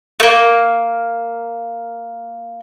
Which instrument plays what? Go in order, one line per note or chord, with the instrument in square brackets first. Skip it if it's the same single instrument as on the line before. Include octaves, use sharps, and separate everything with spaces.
[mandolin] A3 A#3